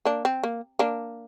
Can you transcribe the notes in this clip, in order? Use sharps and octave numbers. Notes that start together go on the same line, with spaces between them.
A#3 D4
C4
A#3
A#3 D4